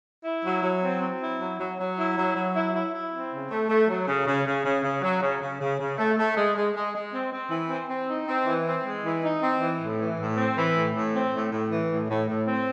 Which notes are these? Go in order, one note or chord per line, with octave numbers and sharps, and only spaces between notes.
E4
F#3
F#3
C4
C4
E4
F#3
F#3
F#3
E4
F#3
F#3
E4
E4
E4
C4
C#3
A3
A3
F#3
C#3
C#3
C#3
C#3
C#3
F#3
C#3
C#3
C#3
C#3
A3
A3
G#3
G#3
G#3
G#3
C4
C4
E3
C4
C4
D#4
C4
E3
C4
G#3
E3
D#4
C4
E3
A2
E3
A2
C4
E3
A2
A2
C4
A2
A2
E3
A2
A2
A2
C4